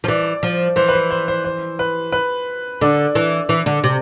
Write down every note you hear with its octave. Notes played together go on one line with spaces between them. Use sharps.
F3
E3 D5
F3
E3 C5
B4
C5
C5
C5
C5
B4
B4
D3 D4
E3
E3
D3
C3